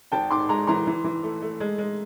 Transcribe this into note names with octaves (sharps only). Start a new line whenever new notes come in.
G#1 G5 A5
G#2 C6 D6
G#3 A#5 C6
E3 A#5 C6
E3
E3
A3
A3
G#3
G#3